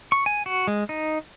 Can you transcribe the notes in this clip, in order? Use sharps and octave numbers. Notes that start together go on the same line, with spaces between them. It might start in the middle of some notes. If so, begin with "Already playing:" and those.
C#6
G#5
F#4
G#3
D#4